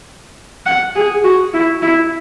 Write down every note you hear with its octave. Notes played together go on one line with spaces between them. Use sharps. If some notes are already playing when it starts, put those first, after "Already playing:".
F#5
G#4
F#4
E4
E4